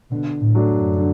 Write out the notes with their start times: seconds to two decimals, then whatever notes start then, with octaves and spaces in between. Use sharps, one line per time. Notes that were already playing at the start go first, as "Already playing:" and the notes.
0.11 B2 D3
0.40 A2
0.55 F#3 A3 D4
0.69 F#2
0.98 D3